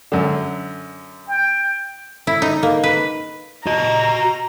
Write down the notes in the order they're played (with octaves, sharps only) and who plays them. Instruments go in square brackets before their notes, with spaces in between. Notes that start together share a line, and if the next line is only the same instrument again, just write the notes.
[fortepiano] F#2 D3
[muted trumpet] G5
[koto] E4
D#4
A#3
B4
[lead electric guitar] F#4 D#5 [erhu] A#5